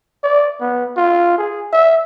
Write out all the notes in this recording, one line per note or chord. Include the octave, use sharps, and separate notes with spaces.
D5
B3
F4
G#4
E5